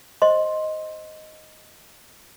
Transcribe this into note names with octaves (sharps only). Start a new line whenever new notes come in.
C5 D#5 C6